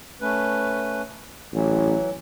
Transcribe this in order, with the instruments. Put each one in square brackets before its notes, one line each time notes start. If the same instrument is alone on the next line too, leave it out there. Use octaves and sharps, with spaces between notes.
[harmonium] A3 C#4 B4
[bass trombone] A1 [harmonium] E3 F#3